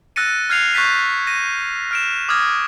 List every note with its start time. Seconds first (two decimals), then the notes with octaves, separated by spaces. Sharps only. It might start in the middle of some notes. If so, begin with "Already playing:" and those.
0.16 E6 F#6 A6 A#6 C#7 D#7
0.50 F6 F#6 G#6 C7 C#7 F7
0.74 C#6 F#6 G6 A6 B6 D#7
1.27 A#6 D#7
1.91 F6 D7 E7
2.29 D6 D#6 F6 G#6 A#6